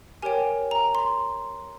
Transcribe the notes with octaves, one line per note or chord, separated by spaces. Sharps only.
G4 A#4 C#5 G5 G#5
A#5
C6